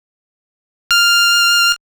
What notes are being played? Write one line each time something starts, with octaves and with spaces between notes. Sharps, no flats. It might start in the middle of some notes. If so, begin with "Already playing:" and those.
F6